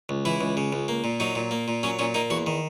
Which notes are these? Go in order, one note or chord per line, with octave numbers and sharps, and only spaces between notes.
C#2
E3 E4
C#2
C#3
C#2
A#3
A#2
F#3 D#4
A#2
A#3
A#2
F#3 C#4
A#2 C#4
A#3 D#4
E2 F#4
D#3